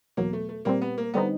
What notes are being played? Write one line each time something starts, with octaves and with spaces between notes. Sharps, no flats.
E2 B2 F#3 A#3
A3
A3
A#2 G3 A#3 C4
B3
A#3
D3 G3 B3 C4 D#4